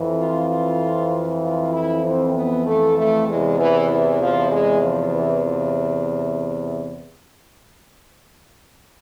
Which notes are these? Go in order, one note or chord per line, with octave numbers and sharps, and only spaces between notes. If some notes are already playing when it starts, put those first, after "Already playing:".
Already playing: F2 E3
F4
F4
F4
E4
C4
B3
A3
A3
E2 C3 E3 G#3
E3
E3
F3
G#3
F3
E3
F3